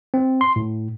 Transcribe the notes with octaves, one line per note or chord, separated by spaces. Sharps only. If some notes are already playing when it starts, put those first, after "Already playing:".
C4
C6
A2